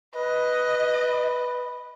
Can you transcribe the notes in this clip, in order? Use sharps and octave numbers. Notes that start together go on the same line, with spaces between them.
B4 D#5